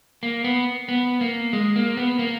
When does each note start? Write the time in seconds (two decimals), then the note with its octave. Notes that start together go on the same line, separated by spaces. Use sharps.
0.23 A#3
0.44 B3
0.89 B3
1.21 A#3
1.53 G#3
1.76 A#3
1.97 B3
2.19 A#3